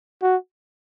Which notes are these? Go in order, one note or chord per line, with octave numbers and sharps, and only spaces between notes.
F#4